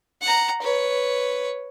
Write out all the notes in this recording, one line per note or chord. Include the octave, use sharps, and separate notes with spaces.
F#5 A#5
B4 C#5